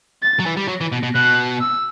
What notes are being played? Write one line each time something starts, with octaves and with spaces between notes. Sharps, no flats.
A6
F#3
E3
G3
F#3
E3
B2
B2
B2 F#6
E6